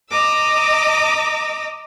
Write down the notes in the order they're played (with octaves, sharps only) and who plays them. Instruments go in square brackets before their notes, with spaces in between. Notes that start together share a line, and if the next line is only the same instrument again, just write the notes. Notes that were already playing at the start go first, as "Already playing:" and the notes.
[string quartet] D#5 A#5 D6 E6